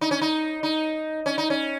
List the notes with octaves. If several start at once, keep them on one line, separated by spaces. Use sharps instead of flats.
D#4
C#4
D#4
D#4
C#4
D#4
C#4